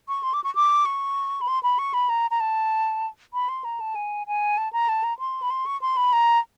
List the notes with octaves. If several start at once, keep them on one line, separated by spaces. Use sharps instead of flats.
C#6
C6
D6
C#6
D6
C#6
B5
C6
B5
C#6
B5
A#5
A#5
A5
B5
C6
A#5
A5
G#5
G#5
A5
A#5
A5
A#5
C6
B5
C6
C#6
C6
B5
A#5